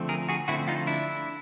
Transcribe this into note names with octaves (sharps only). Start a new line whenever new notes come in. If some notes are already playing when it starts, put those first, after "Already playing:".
Already playing: D3 F3 A3 C4
G#4 A#4
F#4 G#4
D3 F3 A3 C4 E4 F#4
D#4 F4
D4 E4